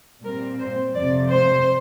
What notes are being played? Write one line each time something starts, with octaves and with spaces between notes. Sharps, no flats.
A#2 G3 C4 A#4
C5
F2 C3 F3 D5
C5